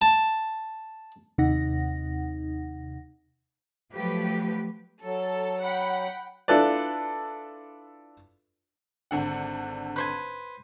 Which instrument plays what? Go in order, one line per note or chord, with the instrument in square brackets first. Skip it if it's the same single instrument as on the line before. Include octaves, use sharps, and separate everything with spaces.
[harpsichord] A5
[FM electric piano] D#2 C3 D#4 F#5 A#6
[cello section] F3 F#3 A3 G4 B4
[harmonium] F#3 [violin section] A4
[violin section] F#5 G5 B5
[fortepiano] D4 E4 F4 A4 B4 D5
[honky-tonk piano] G#1 D3 F#5
[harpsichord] B4 C5 G#5